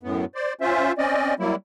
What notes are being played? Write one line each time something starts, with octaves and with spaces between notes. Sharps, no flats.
F#2 A2 B3
C5 D5
C#4 F4 C5 E5
C4 C#4 D5 D#5
F#3 G3 A#3 E4